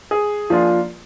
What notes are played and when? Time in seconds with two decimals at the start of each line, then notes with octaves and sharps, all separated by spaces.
0.11 G#4
0.50 F3 A#3 D4 F4